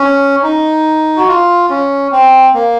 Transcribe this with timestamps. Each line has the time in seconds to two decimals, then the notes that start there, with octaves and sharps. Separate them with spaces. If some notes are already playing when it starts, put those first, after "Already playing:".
Already playing: C#4
0.43 D#4
1.17 F#4
1.28 F4
1.70 C#4
2.12 C4
2.54 A#3